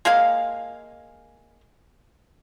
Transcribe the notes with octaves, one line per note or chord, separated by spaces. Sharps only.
G#3 A#3 G#4 F5